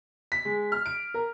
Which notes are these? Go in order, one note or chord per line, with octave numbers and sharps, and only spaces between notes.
B6
G#3
F6
D7
A#4